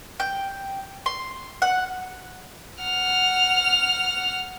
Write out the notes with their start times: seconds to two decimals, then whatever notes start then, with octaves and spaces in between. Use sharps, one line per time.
0.20 G5
1.06 C6
1.62 F#5
2.82 F#5 F6